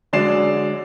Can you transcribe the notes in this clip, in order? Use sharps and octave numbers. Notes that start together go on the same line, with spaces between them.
D3 F#3 G#3 D5 C7 E7